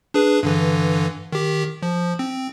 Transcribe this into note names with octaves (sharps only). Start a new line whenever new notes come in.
D4 G#4 B4
G2 D3 E3
D#3 G4
F3
C4